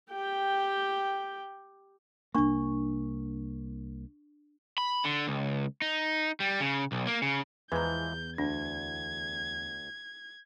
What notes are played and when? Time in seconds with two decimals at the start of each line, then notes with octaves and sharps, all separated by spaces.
0.12 G4 G5
2.35 C2 A#3 D4 C#6
4.78 B5
5.04 D3
5.28 C#2
5.82 D#4
6.40 G3
6.60 C#3
6.92 B1
7.07 A#3
7.22 C#3
7.72 E2 E3 F3 G#3 B4 A#5 G6
8.38 D2 D4 G#6